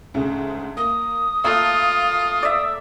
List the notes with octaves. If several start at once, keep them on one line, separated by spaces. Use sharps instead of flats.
D2 G#2 C#3
A#3 D#6
A3 A#3 F4 F5
D5 E5